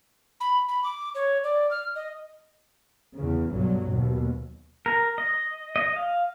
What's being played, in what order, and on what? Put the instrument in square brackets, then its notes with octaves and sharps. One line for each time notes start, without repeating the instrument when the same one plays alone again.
[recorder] B5
B5
D6
C#5
D5
F6
D#5
[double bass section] E2 C#3
B1 G2 F#3
D#2 B2
[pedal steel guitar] A#4
D#5
D#5
F5